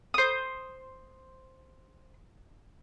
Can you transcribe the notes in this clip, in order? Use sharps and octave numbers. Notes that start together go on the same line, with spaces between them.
C5 D#6